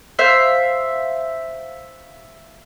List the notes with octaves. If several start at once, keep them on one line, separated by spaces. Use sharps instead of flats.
C5 E5 F5